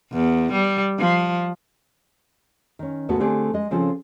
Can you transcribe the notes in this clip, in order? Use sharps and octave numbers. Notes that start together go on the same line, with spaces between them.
E2
G3
F3
D#3 C#4
D#2 G#2 A3 B3 F#4 A4
D3 A3 C4 G4 G#4
G#3 D#5
C#3 F3 C4 C#4 F4 A4